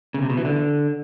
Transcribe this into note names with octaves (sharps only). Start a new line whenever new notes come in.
C#3
C3
B2
E3
D3